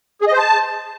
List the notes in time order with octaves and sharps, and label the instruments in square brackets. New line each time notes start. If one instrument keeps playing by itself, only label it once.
[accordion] G#4
D#5
C5
A5